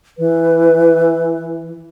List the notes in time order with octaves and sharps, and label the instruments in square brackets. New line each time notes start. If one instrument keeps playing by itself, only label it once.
[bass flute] E3 [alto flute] B4